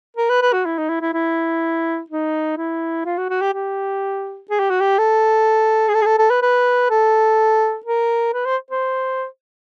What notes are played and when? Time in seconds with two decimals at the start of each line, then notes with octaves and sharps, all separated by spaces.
0.17 A#4
0.29 B4
0.42 B4
0.53 F#4
0.65 E4
0.78 D#4
0.89 E4
1.01 E4
1.13 E4
2.10 D#4
2.57 E4
3.05 F4
3.18 F#4
3.30 F#4
3.41 G4
3.54 G4
4.50 G#4
4.60 G4
4.70 F#4
4.80 G4
4.98 A4
5.88 G#4
5.94 A4
6.01 G#4
6.06 A4
6.18 A4
6.30 B4
6.42 B4
6.90 A4
7.86 A#4
8.34 B4
8.45 C5
8.71 C5